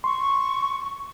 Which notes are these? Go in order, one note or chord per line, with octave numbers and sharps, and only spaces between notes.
C6 C#6